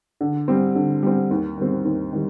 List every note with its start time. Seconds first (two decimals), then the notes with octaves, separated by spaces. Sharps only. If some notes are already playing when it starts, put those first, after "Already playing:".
0.21 D3
0.48 G3 C4
0.75 D3
1.03 G3 C4
1.31 D#2
1.58 D#3 G3 C4
1.85 D#2
2.13 D#3 G3